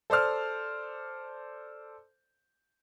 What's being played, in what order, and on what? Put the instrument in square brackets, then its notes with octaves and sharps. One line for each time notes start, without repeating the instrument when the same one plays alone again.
[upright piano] A4 C5 D5 F6